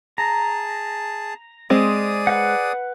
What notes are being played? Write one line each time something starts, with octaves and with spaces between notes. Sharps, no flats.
G#4 A5 A#5
G#3 C4 G#4 D5 D#6
B4 F#5